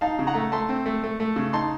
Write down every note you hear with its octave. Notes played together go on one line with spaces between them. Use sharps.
D#4 F5 A5
C#3
F#5 A#5
A3
A3 A5 C6
C4
A3
A3
A3
C#3
D#4 A5 C6